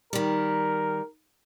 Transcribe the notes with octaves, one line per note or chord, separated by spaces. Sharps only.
D#3 G3 A#4